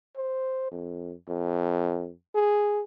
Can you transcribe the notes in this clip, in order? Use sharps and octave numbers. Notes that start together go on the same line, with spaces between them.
C5
F2
F2
G#4